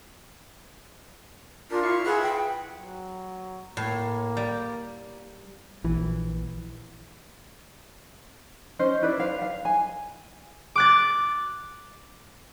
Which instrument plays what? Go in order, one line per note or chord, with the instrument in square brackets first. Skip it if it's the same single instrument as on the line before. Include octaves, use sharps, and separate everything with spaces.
[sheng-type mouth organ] D4 A#4 [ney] F4
[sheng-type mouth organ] E4 F5 C#6
[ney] G#4 [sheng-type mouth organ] B4 E5 F#5
[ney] G5
[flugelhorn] F#3
[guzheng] A2 [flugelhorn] A#3
[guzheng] G3
[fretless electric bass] A#1 E3
[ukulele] C#4 C5 D#5
E4 B4 D5
F5
F5
G#5
[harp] D6 F#6 A6